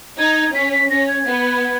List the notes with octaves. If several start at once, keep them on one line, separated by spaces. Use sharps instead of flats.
D#4 G#6
C#4 B6
B6
C#4 A#6
G#6
B3